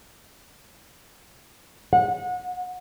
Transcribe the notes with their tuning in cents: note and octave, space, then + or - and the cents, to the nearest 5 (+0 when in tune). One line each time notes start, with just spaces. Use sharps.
F#5 -25